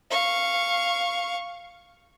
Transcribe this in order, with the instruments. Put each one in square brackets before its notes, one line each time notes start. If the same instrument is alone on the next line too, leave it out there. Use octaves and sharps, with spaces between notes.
[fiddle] F5 C#6